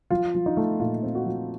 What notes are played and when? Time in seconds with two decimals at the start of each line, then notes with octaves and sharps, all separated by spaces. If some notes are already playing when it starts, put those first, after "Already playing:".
0.10 F3 F4
0.35 F3
0.46 D#4
0.57 A3
0.80 A#2 F4
1.03 C4
1.15 F#4
1.26 F3